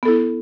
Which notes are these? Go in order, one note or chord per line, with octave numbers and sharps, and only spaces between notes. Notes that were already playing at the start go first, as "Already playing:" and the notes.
B3 E4 A4